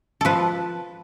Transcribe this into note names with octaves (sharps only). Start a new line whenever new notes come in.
F3 A4 B4